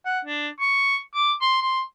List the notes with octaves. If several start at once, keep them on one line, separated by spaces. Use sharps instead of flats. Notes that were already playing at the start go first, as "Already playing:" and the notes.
F#5
D4
C#6
D6
C6
C6